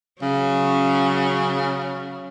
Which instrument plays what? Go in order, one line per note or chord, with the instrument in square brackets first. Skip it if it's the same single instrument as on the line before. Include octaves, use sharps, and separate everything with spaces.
[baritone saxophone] C#3 [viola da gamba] F#3 C#4